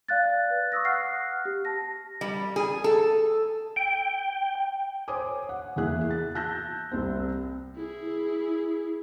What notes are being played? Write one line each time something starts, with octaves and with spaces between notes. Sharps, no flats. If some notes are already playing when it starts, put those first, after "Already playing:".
D5 F5 F#6 A6
B4
C#6 D#6 E6 A#6
F5 F#5 F6 F#6 C7
G4
A5 A#6
G3
G#4
A4
G5
C5 C#5 G#5 D6 D#6
F#5
E2 E3 A#3 E4 G#4 F#6
A6
A5 E6 F#6 G6 A#6
C2 C3 C4
E4 G#4